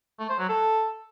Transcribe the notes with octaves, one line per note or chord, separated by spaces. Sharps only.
A3
C5
F#3
A4